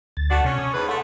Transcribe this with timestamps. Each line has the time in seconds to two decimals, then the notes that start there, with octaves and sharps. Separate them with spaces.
0.17 D2 A6
0.30 A3 D4 F#4
0.44 C3 C#4
0.59 D#6
0.73 E2 G#2 B4
0.88 A3 F#5 C6